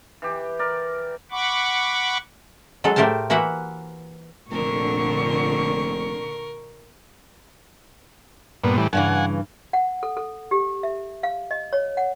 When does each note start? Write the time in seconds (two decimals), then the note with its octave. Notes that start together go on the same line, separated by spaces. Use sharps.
0.22 E3 G4
0.59 A#4 D5
1.31 F#5 B5 C#6 D6
2.84 F#3 G#3 A4
2.96 A2 A3 G4 A#4 C5 A5
3.30 E3 A#3 F#4 E5 F#5
4.51 F1 A#2 D3 A#4 C#6
8.64 G2 A#2 B3
8.78 A2 E3 G3
8.93 G2 C#3 E3 F#5 G#5
9.73 F#5
10.03 A4
10.17 A4
10.51 G4
10.83 E5
11.23 F5
11.51 D#5
11.73 C#5
11.97 F#5